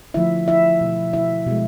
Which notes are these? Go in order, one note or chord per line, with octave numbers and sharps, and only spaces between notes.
D3 F3 A3 E4 E5
E4 E5
B2 A3
E4 E5
B2 G#3